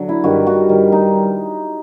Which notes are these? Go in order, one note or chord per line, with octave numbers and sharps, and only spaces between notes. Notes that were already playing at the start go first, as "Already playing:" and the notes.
Already playing: D3 F#3
E4
G2 D#3 G3 F#4
F#4
G2 D#3 G3
D#4